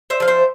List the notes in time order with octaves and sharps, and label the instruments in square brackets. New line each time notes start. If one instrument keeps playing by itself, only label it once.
[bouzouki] C5 E5
F3 F5
C5 E5